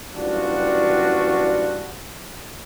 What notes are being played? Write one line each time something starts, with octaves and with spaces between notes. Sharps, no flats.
F#1 E3 G3 D4 F4 F#4